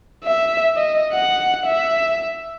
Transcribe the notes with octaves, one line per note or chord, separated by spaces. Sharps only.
E5
D#5
F#5
E5